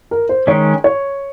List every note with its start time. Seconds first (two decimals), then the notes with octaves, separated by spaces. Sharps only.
0.11 A#4
0.29 C5
0.47 D#3 G#3 C#4 C#5
0.84 C#5